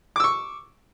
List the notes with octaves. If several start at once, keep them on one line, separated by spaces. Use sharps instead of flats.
C#6 D6 E6